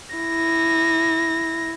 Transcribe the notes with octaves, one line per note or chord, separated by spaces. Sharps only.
E4 A#6